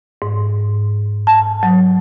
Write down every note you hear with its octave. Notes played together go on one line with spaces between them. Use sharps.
G#2
A5
F#3